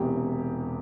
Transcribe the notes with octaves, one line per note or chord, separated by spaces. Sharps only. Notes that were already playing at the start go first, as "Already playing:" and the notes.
Already playing: E1 E2 C3 G4